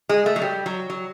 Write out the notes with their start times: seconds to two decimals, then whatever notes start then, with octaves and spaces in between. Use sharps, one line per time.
0.09 G#3
0.26 A3
0.36 F#3
0.42 G3
0.66 F#3
0.90 F#3